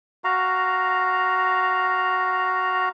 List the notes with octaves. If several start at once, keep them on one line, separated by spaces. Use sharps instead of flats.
F#4 F5 A#5